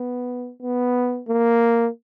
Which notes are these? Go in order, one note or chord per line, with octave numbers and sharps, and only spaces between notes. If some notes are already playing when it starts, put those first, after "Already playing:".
Already playing: B3
B3
A#3